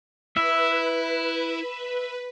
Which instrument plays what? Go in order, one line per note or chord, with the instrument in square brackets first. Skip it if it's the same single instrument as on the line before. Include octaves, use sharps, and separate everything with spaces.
[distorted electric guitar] E4 [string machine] B4 [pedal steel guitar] E5